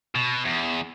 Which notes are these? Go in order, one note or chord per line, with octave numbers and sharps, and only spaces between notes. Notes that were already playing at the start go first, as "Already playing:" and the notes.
B2
E2